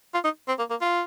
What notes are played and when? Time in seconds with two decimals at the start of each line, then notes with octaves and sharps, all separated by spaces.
0.14 F4
0.24 D#4
0.48 C4
0.58 A#3
0.70 A#3
0.81 F4